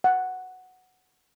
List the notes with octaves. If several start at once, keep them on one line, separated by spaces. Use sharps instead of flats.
F#5